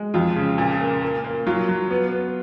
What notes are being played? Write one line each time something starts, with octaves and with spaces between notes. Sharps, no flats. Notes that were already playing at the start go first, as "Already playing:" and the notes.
Already playing: G#3
F2 F4
C#3
A#2
A#3
A#3
A#3
F#3 F4
F#3
B3
B3